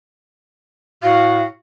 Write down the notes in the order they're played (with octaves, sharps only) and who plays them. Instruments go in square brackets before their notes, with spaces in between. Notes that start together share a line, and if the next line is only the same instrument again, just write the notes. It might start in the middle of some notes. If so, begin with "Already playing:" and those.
[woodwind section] A2 F#4 [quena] F5